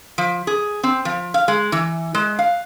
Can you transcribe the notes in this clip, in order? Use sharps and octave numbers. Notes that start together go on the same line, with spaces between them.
F3
G#4
C4
F3
F5
G#3
E3
G#3
F5